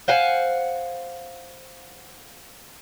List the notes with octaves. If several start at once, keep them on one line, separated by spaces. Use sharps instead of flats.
C5 F5 F#5 G#5